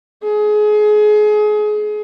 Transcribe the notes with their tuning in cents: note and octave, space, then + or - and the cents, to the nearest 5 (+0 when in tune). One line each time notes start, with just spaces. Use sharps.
G#4 +25